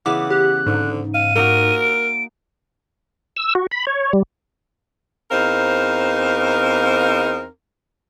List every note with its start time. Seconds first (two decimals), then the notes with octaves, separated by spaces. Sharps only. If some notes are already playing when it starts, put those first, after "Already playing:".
0.06 C#3 E3 B3 F#5 D6
0.30 G4 F#6
0.66 G#2 D3
1.14 F5 D#7
1.36 A#3 D#4 F#4 A#4
1.81 D7
3.37 E6
3.55 F#4
3.71 B5
3.87 C#5
4.13 G3
5.31 E2 C4 D#4 A#4 C5 F5